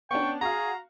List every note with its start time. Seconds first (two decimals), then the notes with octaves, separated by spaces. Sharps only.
0.11 B3 C#4 D4 G5 C#6
0.41 F#4 G#4 F5 A#5